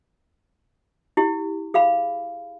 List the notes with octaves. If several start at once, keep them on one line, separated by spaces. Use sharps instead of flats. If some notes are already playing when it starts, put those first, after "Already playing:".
E4 G4
G#4 F5 B5